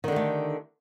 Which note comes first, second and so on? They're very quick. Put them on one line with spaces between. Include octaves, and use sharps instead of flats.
D#3 D3 G4 A3